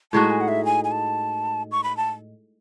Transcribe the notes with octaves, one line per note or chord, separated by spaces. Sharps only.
A2 G#3 D#4 F#4 A5
G#5
F#5
E5
G#5
G#5
A5
C#6
B5
A5